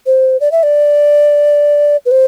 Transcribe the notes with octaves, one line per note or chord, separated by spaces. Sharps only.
C5
D5
E5
D5
B4
C5